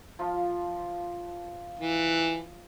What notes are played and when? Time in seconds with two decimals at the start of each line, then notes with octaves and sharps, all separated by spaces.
0.19 F3 F4
1.79 E3